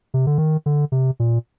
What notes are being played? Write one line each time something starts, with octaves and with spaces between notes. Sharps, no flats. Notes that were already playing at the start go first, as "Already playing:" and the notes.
C3
D3
D#3
D3
C3
A#2